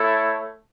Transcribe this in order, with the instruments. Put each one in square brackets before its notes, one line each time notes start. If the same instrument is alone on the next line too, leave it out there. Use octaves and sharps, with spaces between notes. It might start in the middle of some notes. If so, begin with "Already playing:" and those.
Already playing: [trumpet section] A3 E4 A4 C#5